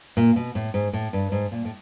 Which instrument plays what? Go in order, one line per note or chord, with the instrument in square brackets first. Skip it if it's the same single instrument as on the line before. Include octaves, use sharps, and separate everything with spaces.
[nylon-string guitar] A#2
B2
A2
G#2
A2
G2
G#2
A#2
A2